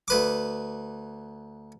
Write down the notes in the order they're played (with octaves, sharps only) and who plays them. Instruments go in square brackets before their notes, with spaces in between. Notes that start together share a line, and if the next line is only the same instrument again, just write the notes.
[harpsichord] D2 B4 D6